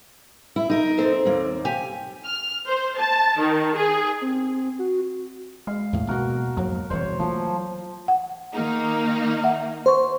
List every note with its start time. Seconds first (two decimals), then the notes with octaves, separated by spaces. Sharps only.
0.56 E4
0.70 D#4 A#4
0.98 C4 A4 C5
1.25 D#2 A#3
1.65 G4 G#5
2.25 F6
2.67 C5
2.98 A5
3.38 D#3
3.76 G#4
4.21 C4
4.79 F#4
5.67 G#3 F5
5.93 E2 A2
6.08 B2 A#3 F#4 A#4
6.57 F2 G#2 F#3 A#3
6.90 E1 C2 E3 C5 C#5
7.19 E3 F3 A3 A#3
8.08 F#5
8.53 D#3 A#3 D#4
9.44 E5 F#5
9.86 C5 C6 C#6